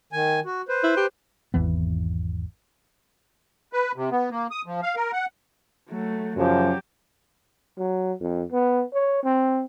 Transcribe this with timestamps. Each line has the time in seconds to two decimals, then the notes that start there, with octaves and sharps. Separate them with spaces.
0.13 D#3 G#5
0.45 F#4
0.69 B4 C5
0.83 E4
0.97 G4
1.54 G#1 E2 E3 B3
3.73 B4
3.96 C3
4.11 B3
4.31 A#3
4.51 D#6
4.66 F3
4.83 F5
4.96 A#4
5.13 F#5
5.89 F#3 A3
6.36 F#2 C#3 F3 F#3 G4
7.78 F#3
8.20 F2
8.52 B3
8.93 C#5
9.23 C4